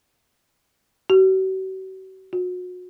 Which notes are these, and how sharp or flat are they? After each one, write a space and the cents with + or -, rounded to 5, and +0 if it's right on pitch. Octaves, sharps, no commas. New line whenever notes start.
F#4 +45
F#4 -35